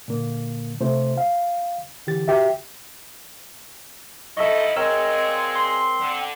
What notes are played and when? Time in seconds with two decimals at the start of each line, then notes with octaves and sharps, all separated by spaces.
0.08 A#2 D3 A#3
0.80 C3 A3 F4 C5
1.18 F5
2.07 D3 E3 G4 A6
2.28 F#4 G4 E5
4.37 F3 D#4 E4 A4 D#5 E5 C#6
4.77 A#2 G#3 C4 G#4 A#4 C#5 D#5 E6
5.55 C6
6.00 D3